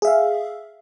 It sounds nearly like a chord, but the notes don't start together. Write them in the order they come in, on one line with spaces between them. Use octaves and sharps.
G#4 E5 F5